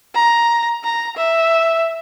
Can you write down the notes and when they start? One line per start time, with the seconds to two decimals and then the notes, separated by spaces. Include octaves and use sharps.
0.15 A#5
0.84 A#5
1.17 E5